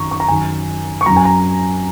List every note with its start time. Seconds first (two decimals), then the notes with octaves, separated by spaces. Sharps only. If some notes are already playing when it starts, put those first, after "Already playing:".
Already playing: F#2 D#3 F#3 A#5 C#6
0.11 C#6
0.20 A#5
0.28 F#2 D#3 F#3 G#5
1.01 C#6
1.06 F#3 A#5
1.10 F#2
1.16 G#5
1.25 A#5